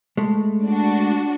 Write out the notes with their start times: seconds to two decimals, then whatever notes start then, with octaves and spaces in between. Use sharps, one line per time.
0.17 G#3 A3
0.64 D4 F#4